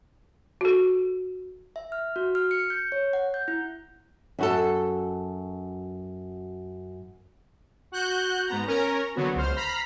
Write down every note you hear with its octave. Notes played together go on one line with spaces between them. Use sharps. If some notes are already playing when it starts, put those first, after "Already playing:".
F#4 A4
E5
F6
F#4
F6
C#7
G6
C#5
F#5
G6
E4
F#2 F#4 A4
F#4 F#6 G6
G#2 B3 A#5
C#4 A#4 A#5
D3 F#3 B3 F#4
C#2 C5 F6
A#5 B5 F6 B6 C7